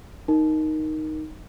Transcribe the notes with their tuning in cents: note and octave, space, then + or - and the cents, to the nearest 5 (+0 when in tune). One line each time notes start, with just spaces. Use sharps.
D#4 +0 A#4 +0